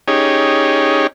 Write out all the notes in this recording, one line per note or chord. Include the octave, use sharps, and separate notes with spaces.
C#4 D#4 G4 G#4 C#5